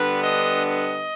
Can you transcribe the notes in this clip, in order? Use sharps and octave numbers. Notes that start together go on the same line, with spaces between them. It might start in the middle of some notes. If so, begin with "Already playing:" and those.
Already playing: D3 G3 B3 D4 B4
D#5
D#5